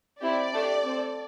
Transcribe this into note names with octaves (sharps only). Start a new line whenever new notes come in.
C4 E4 G4 D5
A3 D4 G4
C4 A4